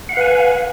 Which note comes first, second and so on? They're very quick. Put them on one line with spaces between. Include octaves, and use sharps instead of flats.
F#5 F5 B4 G#5